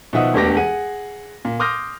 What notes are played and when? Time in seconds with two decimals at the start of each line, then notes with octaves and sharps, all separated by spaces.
0.13 B2 D#3 F3 E5 F#5 D#6
0.34 E1 D2 B3 G4 D6 A#6
0.57 G#4 F#5 D#7
1.45 A#2
1.59 C6 D6 D#6 F6 G6 A#6